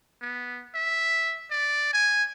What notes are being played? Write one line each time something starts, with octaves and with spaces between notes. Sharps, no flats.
B3
E5
D5
G#5